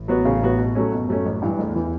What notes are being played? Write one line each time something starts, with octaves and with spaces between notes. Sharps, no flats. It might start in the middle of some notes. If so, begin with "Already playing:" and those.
Already playing: A1 A2
F#3 B3 F#4
C#3
F#3 B3 F#4
B2
F#3 A3 C#4
F#2 B2
F#3 A3 C#4
A1
G2 E3
A1 E2
E3